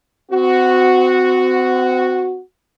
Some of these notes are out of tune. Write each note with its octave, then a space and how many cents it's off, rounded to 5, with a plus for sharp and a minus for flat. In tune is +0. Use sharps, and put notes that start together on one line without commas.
C4 -35 F#4 -5